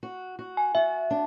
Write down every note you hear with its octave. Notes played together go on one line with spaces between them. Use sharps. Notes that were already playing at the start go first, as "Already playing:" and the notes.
F#4
F#4
G#5
F#4 E5
D4